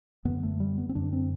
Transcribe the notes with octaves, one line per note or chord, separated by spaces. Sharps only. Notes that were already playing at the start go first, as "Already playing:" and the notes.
F#2 D3 B3
A3
G3
B3
C4
F#2 D3 D4
C4